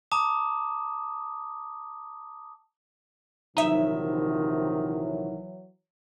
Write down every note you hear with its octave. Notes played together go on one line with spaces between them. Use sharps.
A5 A#5 D6 D#6
A#1 C3 D#3 E3 F#3 D#4 E4 E5